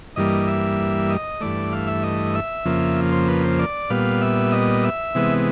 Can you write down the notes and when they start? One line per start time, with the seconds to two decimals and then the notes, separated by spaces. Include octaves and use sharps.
0.16 G2 E3 G3 A#3 D#5
0.48 E5
1.10 D#5
1.41 G2 E3 A3 D5
1.72 F5
1.87 E5
2.03 D#5
2.35 E5
2.65 F2 C#3 F3 A#3
3.12 C5
3.28 B4
3.44 C5
3.59 D5
3.90 A#2 G3 B3 F5
4.22 E5
4.52 D#5
4.84 E5
5.15 C3 E3 G#3 B3